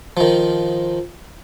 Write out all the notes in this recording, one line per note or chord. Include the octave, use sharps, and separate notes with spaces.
D#3 F3